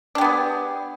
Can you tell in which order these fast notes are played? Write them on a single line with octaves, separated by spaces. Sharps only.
D4 G4 B3 G#4